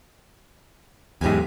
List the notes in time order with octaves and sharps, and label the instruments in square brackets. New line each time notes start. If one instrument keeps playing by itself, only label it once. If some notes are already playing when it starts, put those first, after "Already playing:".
[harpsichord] B1 G4 G#5 [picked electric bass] E2 G#2